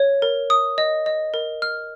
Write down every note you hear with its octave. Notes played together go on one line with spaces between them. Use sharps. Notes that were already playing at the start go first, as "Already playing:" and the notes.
Already playing: C#5
A#4
D#6
D#5
D#5
A#4
F6